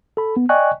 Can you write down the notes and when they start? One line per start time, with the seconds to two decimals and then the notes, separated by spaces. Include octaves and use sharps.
0.17 A4 B5
0.37 B3
0.49 D5 D#5 G5 G#5 C#6 F#6